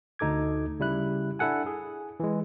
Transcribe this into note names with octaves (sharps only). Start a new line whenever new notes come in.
D2 D#4 A4 D6 G#6
C#3 G3 E4 F#6
D4 E4 A4 F#5 G#5
G#4
E3 G#3